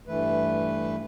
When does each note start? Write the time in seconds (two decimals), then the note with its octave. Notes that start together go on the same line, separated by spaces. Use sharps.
0.07 G2 E3 A3 B4